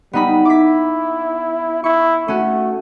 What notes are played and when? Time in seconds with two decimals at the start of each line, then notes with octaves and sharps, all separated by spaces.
0.13 G3 B3 D#4 B5
0.45 E4 D6 B6
1.84 E4 C#6
2.28 A3 C#4 F#4